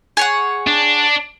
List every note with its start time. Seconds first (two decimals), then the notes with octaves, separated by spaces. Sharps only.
0.17 G#4 C#5 F#5
0.67 D4